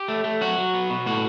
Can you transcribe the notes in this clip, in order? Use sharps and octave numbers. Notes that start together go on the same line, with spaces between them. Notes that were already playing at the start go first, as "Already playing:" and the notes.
Already playing: G4
A3
A3
F#3 F#4
F#3
B3
B2
A2 F#4